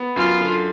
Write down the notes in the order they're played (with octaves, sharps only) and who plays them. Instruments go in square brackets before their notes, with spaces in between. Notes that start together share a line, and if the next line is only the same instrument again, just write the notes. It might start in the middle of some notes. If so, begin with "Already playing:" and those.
Already playing: [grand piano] B3
[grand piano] F#2 [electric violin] F4
[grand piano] D3